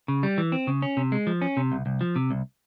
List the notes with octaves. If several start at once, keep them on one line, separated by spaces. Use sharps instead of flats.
C#3
G3
E3
C4
C#3
C#4
C3
G#3
F3
C#4
C3
C2
C2
F3
C3
C2